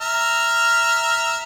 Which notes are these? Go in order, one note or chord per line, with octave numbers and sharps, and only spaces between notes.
E5 A#5 F6